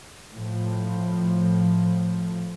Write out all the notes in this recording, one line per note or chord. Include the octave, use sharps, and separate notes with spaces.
A2 F3